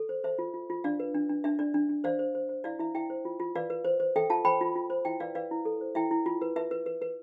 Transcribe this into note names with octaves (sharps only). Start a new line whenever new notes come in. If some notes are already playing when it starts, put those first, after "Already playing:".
Already playing: A4
C5
C5 E5
F4
F4
F4
D4 D5 F5
B4
D4
D4
D4 E5
D4 D5
D4
D4
C5 D5 F5
C5
C5
C5
E4 D5 F5
E4 E5
E4 E5 G5
C5
F4
F4
B4 D5 F5
B4
C5
C5
A4 E5 G5
F4 F5 A5
C5 G5 B5
F4
F4
C5
E4 E5 G5
B4 D5 F5
B4 D5 F5
E4
A4
C5
E4 E5 G5
E4
F4
B4
B4 E5
B4
B4
B4